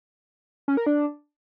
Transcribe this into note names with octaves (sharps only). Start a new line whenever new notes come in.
C#4
A#4
D4